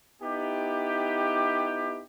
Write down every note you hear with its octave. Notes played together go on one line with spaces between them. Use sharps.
B3 D#4 E4 G4